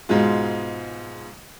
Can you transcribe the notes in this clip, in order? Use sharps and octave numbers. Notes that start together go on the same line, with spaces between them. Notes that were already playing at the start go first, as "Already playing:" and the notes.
G#2 B2 G#3 F4